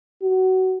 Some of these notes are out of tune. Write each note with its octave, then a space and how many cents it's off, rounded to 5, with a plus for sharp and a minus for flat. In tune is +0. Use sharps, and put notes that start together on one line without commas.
F#4 +20